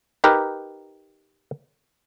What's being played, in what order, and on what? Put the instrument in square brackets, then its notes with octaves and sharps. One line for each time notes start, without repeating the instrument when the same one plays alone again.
[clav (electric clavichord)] D#4 G4 A#4 B4